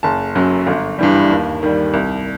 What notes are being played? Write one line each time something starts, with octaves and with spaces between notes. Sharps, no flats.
F#1 A5
F#2 F#3
G1
G2 E3 G3
D#2
D#3 G3
C2